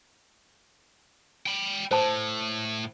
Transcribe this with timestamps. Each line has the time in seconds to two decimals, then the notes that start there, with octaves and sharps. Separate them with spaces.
1.46 G5 B5
1.91 A2 C5 A5